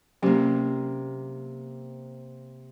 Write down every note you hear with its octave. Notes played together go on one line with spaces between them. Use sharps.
C3 F#3 A#3 C#4 G4